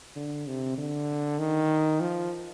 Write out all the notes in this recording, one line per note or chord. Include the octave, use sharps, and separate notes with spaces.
D3
C3
D3
D#3
F3